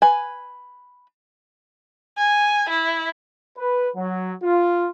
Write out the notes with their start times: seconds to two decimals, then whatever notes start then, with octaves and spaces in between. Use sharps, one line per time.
0.02 B4 G#5
2.18 G#5
2.70 E4
3.58 B4
3.95 F#3
4.43 F4